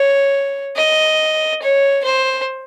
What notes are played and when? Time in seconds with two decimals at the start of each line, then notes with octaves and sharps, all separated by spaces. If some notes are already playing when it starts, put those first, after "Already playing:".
Already playing: C#5
0.77 D#5
1.62 C#5
2.05 C5